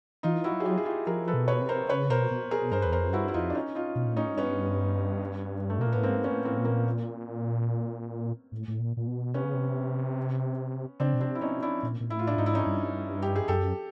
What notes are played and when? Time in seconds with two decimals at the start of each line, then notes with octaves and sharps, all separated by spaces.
0.23 E3 D#4 F4
0.44 E4 F#4
0.52 F#3
0.60 G#4
0.65 F4 G4
0.78 G#4
0.85 F4 G4
1.07 F3 G#4 A#4
1.28 A4 B4
1.34 B2
1.48 B4 C#5
1.61 C3
1.69 A#4 C5
1.85 C3
1.89 C#3 B4 C#5
2.10 B2 A#4 C5
2.31 B2
2.51 B2 G#4 A#4
2.72 G2 A#4 C5
2.82 E2 B4
2.92 F2 A#4 C5
3.09 F#2
3.13 G2 E4 F#4
3.28 E4
3.34 F2 D#4 F4
3.50 D4
3.55 C#4 D#4
3.75 D#4 F4
3.95 B2
4.06 A#2
4.16 A2 C#4 D#4
4.27 G#2
4.37 G2 B3 C#4
5.70 A3
5.79 B2 A#3
5.87 A#2
5.92 A2 B3
6.03 G#2 A#3 C4
6.24 B3 C#4
6.31 A2
6.45 A#3 C4
6.58 A#2
6.65 A#3
8.52 A2
8.68 A2
8.80 A#2
8.97 A#2
9.07 B2
9.34 C3 B3 C#4
9.44 C#3
9.54 C3
11.00 C#3 C4 D4
11.14 B2
11.20 C3 C4 D4
11.35 E4
11.41 B2 C#4 D#4
11.62 D4 E4
11.83 A#2
12.00 A#2
12.10 A2 E4
12.19 F4
12.27 D4 E4
12.37 G#2 D#4
12.46 E4
12.54 C#4 D#4
12.66 G2
13.22 G4
13.36 G#4
13.48 F#2 G4 A4